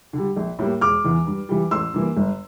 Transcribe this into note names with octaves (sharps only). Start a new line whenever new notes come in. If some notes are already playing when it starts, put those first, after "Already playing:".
D3 G3
A#1
A2 G3 A#3
E1 D6 F6
E2 E3
G2
E3 G3
A1 C6 E6
G2 E3 A#3
G1